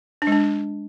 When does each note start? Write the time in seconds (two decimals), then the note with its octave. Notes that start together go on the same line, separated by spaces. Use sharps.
0.22 D4
0.27 G#3
0.32 D4